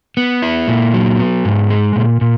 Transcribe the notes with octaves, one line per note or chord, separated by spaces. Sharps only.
B3
E4
A#2
F#3
B3
G#2
G#3
A#2
A#2